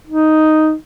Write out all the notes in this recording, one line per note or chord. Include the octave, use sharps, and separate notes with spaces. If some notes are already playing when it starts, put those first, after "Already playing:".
D#4